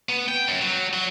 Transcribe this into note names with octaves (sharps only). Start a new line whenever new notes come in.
B3
G5
F#2
F#3
F#3